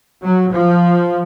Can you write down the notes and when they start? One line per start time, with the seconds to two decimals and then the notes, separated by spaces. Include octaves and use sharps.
0.23 F#3
0.52 F3